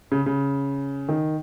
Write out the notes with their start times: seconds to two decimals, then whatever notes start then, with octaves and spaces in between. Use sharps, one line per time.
0.12 C#3
0.26 C#3
1.09 D#3